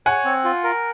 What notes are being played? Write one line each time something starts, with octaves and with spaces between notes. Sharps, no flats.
C#5 F#5 G#5
C4
F4
A#4